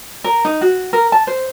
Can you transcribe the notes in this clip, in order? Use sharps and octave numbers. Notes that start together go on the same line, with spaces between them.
A#4
D#4
F#4
A#4
A5
C5